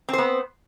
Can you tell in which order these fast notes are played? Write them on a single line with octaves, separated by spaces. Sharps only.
C4 C5 B3